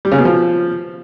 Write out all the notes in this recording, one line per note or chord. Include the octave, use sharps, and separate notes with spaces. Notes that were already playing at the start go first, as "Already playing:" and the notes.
G3
C#3
B2
F3